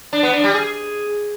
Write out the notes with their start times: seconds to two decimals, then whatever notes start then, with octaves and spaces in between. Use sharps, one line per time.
0.13 D4
0.23 B3
0.33 D4
0.44 G3
0.54 G#4